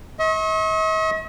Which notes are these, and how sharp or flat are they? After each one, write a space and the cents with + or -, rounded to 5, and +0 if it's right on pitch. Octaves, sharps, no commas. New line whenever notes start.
D#5 +45 C#6 -40